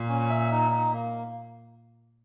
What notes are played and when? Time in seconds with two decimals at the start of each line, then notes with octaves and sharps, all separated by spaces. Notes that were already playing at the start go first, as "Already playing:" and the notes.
Already playing: A#2
0.09 C#4
0.30 E5
0.51 D#4
0.71 D#4
0.92 A#3